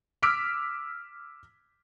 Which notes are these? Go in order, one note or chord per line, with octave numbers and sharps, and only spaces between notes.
D6 E6 F6 B6 D7